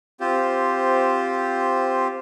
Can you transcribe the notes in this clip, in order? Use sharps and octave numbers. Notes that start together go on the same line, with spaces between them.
C4 F4 G4 C5